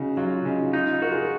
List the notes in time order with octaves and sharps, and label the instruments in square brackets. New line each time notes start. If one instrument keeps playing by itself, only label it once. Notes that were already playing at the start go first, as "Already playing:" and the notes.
Already playing: [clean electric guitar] C#3 [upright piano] D#4 F#4
[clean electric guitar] F#3 [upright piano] F4
[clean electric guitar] C#3 [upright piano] D#4
[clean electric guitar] D#4 [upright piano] F4
[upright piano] F4
[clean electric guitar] F#4 [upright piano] A#4
[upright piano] F4 G#4